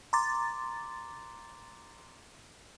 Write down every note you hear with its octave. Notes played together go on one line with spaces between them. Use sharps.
A#5 C6 D6 A6